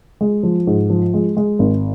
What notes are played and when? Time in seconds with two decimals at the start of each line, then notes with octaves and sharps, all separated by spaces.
0.21 G#3
0.43 F3
0.67 G#2
0.90 F3
1.14 G#3
1.37 G#3
1.59 G#1